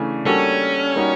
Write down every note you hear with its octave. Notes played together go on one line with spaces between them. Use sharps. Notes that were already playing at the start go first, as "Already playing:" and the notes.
Already playing: C#3 E3 A3 D4
G3 A#3 C#4 D4 F#4 A4
G3 A#3 D#4 F#4